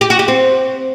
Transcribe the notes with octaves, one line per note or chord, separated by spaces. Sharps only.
G4
F#4
G4
C4